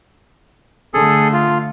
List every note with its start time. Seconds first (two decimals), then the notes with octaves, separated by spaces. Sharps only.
0.94 D3 A3 G#4 A4
1.33 F4